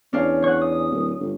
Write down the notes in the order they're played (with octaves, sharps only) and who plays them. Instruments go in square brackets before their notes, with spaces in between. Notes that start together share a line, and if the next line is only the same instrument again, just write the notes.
[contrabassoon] E2 [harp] C#4 D4 F5
[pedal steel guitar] C#5 F#5
D#6
[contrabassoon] D1
G1